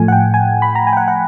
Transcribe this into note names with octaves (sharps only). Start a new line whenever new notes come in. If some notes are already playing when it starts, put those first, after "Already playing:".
Already playing: A2 F3 A3 G#5
F#5
G5
G#5
B5
A#5
G#5
G5
F#5
F#5